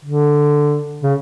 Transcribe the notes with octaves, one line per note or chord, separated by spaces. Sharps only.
D3
C#3